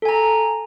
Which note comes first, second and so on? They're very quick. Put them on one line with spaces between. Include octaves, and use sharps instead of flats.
A4 G#5 A#5